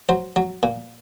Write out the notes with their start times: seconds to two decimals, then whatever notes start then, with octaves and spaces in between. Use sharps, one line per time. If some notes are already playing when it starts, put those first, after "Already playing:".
0.09 F#3 C5
0.36 F#3
0.63 A#2